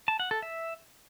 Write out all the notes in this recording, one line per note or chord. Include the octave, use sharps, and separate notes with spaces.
A5
F#5
A4
E5